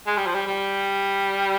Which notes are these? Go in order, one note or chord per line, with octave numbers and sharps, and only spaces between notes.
G#3
G3
F3
G3
G3